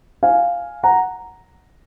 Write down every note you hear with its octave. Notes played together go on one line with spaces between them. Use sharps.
F5 G#5
F#5 A#5